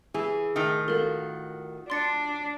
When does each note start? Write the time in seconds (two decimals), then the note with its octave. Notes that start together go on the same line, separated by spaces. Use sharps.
0.14 E3 G#4
0.56 A2 D#3
0.88 F4 F#4 A4 A#4
1.90 D4 C6 A6 C#7